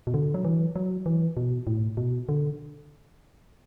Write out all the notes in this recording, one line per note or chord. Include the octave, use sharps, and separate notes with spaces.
B2
D3
F#3
E3
F#3
E3
B2
A2
B2
D3